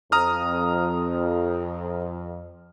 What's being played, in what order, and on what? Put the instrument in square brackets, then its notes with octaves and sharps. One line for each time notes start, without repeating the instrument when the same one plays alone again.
[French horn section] F2 [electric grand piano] A#5 D#6 F6